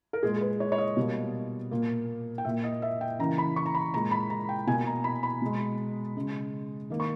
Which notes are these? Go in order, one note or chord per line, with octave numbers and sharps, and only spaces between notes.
A#4
A#2 G#3 G#4
B4
C#5
C#5
D#5
B2 G3 A#3
A#2 A#3
G5
A#2 A#3 E5
D#5
E5
G5
C#3 E3 A#3 A#5
B5
C#6
A#5
B5
A#2 G#3 A#5
B5
A#5
G5
B2 A#3 G#5
A#5
B5
B5
B2 G#3
C#3 G#3
D#3 A#3
C#6